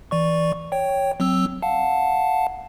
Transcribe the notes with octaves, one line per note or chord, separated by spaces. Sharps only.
E3 D5 C#6
C#5 G5
F#3 C4 E6
F5 F#5 A5